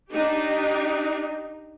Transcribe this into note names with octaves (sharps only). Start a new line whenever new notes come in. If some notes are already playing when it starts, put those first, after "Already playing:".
D4 D#4 G4